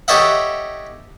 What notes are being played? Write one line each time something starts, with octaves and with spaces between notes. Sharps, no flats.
G4 A4 C#5 D#5 E5 F#5